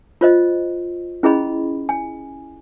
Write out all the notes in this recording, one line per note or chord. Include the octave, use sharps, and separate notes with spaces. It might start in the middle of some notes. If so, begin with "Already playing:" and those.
F4 C5 D#5
C#4 E4 G#4 D#5 B5
G#5